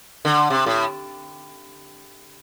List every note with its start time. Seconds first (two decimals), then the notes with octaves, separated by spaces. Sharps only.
0.25 D3
0.50 C3
0.66 A2